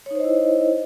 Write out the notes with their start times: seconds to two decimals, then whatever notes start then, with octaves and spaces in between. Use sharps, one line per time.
0.06 C#5
0.11 D#4
0.15 C5
0.20 D#5
0.24 E4